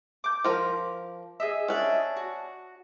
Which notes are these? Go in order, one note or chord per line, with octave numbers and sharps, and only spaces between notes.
D6 G6
F3 A#4
G#4 D#5 E5
C#4 D4
F#4